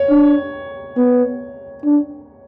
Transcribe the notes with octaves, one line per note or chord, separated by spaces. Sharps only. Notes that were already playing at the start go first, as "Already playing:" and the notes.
Already playing: C#5
D4
B3
D4